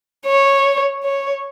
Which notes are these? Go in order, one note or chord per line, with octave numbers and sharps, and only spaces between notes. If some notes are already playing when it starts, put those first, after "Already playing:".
C#5
C#5